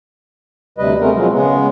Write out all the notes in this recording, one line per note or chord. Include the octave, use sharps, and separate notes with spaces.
D2 C3 G3 B4 D#5
G#3 A3 B3 C4 A#4
B2 F3 F#3 G#3
C#3 G#3 B3